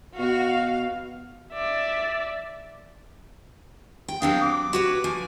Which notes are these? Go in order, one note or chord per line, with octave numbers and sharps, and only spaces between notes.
B2 F#4 F5
D5 E5
G5
F#3 C4 D4 F5 G5 D#6
D6
F#4 B4 C#5
F3 G#5